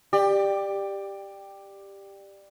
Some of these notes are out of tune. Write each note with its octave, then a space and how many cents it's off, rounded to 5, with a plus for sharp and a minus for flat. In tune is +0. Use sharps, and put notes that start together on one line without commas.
G4 +10 D5 +15